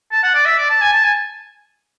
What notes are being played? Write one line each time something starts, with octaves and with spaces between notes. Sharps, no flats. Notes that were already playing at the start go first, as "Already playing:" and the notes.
A5
F#5
D5
E5
D5
A5
G#5
A5
G#5